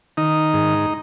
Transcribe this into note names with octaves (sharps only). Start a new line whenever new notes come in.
D#3 D#4
G#2